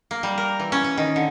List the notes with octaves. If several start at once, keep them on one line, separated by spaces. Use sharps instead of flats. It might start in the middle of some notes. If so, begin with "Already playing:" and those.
A#3
G3
A#4
E3
C#4
C#4
D#3
D3